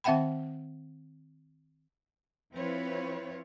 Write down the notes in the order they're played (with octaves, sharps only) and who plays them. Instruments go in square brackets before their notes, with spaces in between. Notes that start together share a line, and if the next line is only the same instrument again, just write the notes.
[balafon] D#3 C4 E5 F#5 G5 B5
[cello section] F3 C4 E4 F4 B4 C#5